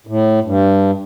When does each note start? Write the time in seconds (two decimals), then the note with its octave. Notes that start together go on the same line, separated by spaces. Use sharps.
0.07 A2
0.44 G2